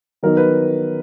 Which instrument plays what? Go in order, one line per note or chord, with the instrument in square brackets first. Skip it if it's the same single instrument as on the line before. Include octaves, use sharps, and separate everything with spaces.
[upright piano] D#3 F#3 B3 D#4 A#4
B4